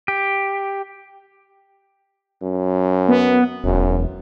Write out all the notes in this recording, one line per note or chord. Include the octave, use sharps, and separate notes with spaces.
G4
F#2
B3
E1 F#2